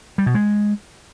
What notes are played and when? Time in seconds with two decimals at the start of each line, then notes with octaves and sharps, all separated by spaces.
0.18 G3
0.26 B2
0.34 G#3